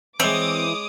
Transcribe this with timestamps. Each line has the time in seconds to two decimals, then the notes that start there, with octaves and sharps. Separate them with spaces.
0.20 E3 G#3 C4 C#5 D6 D#6